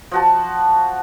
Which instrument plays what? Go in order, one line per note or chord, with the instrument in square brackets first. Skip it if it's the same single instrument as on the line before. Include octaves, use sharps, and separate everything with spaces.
[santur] F3 F#4 A5